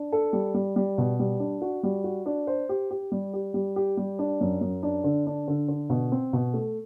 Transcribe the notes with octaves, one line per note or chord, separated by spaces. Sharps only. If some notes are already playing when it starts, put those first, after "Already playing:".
Already playing: D4
A4
G3
G3
G3
B2
G3
D4
F#4
G3
F#4
D4
C5
G4
G4
G3
G4
G3
G4
G3
D4
F#2
F#2
D4
D3
D4
D3
D3
B2
C4
B2
A3